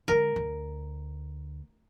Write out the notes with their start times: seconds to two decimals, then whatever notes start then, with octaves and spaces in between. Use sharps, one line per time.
0.08 D3 G#3 A#4
0.36 D2